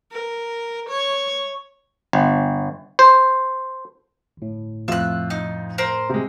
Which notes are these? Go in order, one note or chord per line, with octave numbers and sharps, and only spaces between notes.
A#4
C#5
G1
C5
G1 A2
F2 A3 F4 E6 F#6
D#4
A#4 C5
C3 G#3